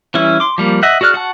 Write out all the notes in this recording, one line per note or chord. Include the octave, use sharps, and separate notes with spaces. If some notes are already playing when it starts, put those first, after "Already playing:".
E3 G3 C#4 E4
C6 D6
F3 G3 A#3
D#5 E5 F#5
F#4 G#4 D5 F6 F#6
F#4 F#5 A5